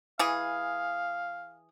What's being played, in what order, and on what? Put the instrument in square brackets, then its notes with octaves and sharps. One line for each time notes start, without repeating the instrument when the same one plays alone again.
[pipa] E3 G#4 [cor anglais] F5